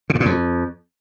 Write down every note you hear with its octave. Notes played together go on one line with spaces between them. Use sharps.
C#3
G2
A#2
F2